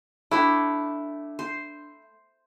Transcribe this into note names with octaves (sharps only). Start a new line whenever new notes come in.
A3 D4 E4 G4
C5